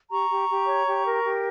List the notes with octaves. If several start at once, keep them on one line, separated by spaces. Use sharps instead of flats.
G4 A#5 C#6
G4
G4
C#5
G4
A#4
G4